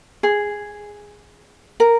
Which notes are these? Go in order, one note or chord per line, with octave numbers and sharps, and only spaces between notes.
G#4
A#4